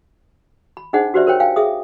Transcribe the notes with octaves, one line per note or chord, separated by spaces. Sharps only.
B5
D4 D#4 G#4 C5 D#5 F#5
F#4 G4 B4 C5 D5 E5
A#4 C5 C#5 G5
F5 G5 G#5
G#4 E5 D#6